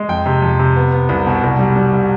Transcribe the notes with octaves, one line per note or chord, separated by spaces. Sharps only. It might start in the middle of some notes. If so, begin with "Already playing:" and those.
Already playing: G#3
F2 G5
C3
F2
C3
B3
B3
C2
B2
C2
G3
G3
C3